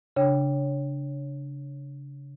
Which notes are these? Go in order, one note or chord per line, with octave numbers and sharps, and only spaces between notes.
C#3 D4 C#5 G5